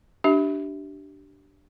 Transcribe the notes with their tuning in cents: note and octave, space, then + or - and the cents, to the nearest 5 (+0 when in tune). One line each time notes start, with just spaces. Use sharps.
D4 +0 G4 -25 E5 -20